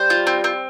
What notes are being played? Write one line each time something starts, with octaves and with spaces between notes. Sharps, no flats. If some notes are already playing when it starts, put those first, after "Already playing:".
Already playing: G3 C5
F4
C4
C4